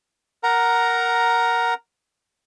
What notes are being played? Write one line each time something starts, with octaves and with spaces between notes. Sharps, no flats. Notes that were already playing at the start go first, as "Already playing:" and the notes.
A#4 F#5 A#5